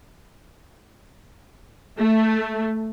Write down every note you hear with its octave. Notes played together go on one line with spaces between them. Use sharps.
A3